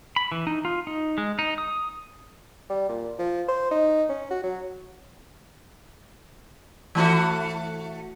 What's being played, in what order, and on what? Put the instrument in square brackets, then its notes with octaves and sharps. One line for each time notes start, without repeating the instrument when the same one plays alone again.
[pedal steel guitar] B5
E3
D#4
F4
D#4
G#3
D#4
D#6
[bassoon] G3
A#2
F3
C5
D#4
C#4
F#4
F#3
[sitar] E3 A3 F#4